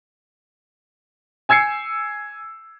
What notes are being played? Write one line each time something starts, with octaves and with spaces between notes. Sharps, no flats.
G#5 E6 G#6 C7 C#7